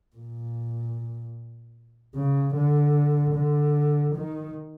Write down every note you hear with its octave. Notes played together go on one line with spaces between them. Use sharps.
A#2
C#3
D3
D3
D#3